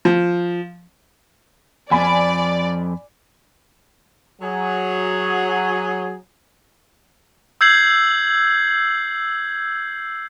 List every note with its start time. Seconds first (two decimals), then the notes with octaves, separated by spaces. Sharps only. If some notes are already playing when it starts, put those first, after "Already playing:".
0.05 F3
1.91 F2 D5 G#5 B5
4.41 F#3 G#4
7.61 E6 G6 G#6 C7 F#7